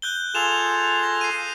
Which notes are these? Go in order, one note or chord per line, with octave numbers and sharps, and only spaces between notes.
F#6 G6 G7
F4 G#4 A4 E7 F7
A#6 F7
C7 D#7